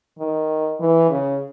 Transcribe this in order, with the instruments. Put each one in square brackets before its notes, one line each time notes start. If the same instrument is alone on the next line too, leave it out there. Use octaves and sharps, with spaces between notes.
[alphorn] D#3
E3
C#3